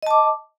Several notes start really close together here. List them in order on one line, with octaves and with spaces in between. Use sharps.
D#5 A5 D6